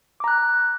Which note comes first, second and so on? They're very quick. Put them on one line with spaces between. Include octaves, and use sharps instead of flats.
D6 A#5 F#6